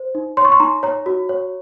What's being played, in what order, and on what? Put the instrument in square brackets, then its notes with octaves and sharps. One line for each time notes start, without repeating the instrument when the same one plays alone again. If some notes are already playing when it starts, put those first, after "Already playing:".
Already playing: [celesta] C5
D#4
C#5 C6
C#6
C6
D#4 A#5
C#5 A#5
F#4
C#5